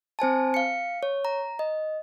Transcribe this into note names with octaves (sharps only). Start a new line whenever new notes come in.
C4 C5 G#5 A5
F5 C#7
C#5
A#5
D#5